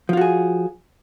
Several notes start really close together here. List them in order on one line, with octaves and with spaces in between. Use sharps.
F3 F4 F#4 G#4